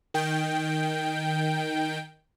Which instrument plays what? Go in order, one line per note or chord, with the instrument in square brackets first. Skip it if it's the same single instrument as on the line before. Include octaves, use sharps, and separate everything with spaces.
[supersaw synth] D#3 G5